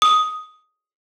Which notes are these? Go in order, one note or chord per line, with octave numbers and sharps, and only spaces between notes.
D#6